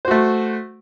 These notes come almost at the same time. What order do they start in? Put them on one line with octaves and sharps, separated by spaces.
C5 F#4 A3